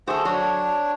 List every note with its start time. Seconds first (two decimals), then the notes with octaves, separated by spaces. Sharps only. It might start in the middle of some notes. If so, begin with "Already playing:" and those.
0.07 A3 F#4 G#4 A4 C5
0.25 F#3 D4 C#5